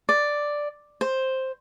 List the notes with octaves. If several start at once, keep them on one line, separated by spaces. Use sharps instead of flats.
D5
C5